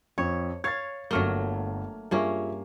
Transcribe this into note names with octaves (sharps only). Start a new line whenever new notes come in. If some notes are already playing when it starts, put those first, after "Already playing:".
F2 C#5
C#5 F5 G#6 A6
G1 F#3 A3 A#3 F6 G7
G2 A#3 C#4 F4 G#4 E5